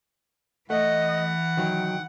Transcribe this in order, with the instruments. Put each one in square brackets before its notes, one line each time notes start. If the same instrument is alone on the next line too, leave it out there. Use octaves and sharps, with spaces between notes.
[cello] E3 [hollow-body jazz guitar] A3 [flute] D#5 [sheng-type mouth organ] F#5
[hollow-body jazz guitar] D#3 F#3 [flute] G5